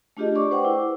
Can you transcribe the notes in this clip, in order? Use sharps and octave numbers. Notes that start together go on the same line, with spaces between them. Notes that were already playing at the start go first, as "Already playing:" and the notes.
A3 D4 F4 G4 G#4 D#5
D5 C#6 D6
B4 C5 F#5 G5
E4